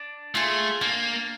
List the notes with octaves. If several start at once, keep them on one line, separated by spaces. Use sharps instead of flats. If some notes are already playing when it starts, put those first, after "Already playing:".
Already playing: D4
A3 F4 G#4
A#3 D4